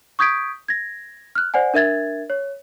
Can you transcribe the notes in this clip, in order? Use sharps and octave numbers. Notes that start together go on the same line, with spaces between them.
C#6 D#6 G6 G#6 B6 D7
G#6 A#6
F6 F#6
C5 D5 F#5 G#5
D4 A#4 E5 G#6 A6
C#5